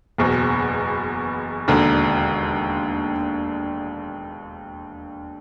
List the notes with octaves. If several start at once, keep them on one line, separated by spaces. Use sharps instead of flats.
F#1 E2 B2
E1 D#2 D3